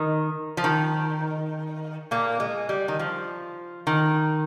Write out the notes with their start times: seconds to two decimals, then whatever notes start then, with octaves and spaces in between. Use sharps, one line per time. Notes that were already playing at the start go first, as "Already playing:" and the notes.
Already playing: D#3
0.57 F3
0.64 D#3
2.11 A#2 A#3
2.40 G#3
2.69 G3
2.88 D#3
2.99 F3
3.87 D#3